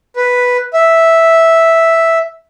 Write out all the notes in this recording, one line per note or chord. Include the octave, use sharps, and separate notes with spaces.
B4
E5